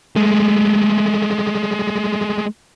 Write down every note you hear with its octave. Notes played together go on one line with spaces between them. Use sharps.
G#3 A3